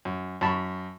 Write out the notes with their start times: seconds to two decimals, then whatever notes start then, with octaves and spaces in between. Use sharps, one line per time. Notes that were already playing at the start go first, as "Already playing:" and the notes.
0.05 F#2
0.41 F#2 A5 B5 C#6